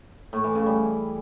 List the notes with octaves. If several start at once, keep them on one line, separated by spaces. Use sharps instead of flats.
A2
E3
C#3
G3